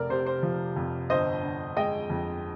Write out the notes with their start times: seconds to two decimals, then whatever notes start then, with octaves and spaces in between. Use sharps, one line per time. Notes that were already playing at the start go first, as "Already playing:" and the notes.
Already playing: F1 A#4 D5
0.10 C3 C5
0.26 C5
0.43 F3
0.76 F2
1.10 G1 C5 D#5
1.43 D3
1.76 G#3 D#5 G5
2.10 F2